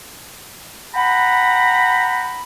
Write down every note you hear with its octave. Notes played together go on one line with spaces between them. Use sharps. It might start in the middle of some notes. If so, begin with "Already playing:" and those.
F#5 G5 A#5 B5